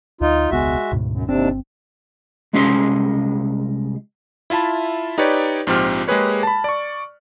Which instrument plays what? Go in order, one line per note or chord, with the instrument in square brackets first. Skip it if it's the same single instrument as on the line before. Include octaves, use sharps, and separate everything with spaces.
[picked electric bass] D2 [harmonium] D#4 F4
[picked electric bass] E1 C#2 B3 [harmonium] G#3 F#4 E5
[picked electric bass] D2 G#2 B2
[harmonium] F#2
[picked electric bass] G1 C4 [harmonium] D#2 C3 D4
[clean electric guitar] C2 G#3 C#4 G4 D#5 C6
[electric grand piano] E4 F4 E5 A5 B5
D#4 G4 B4 C#5 D5
A#1 G#2 F3 C4 G4 F6
G#3 A#3 G4 G#4 B4 C#5
A5 B5
D5 C#6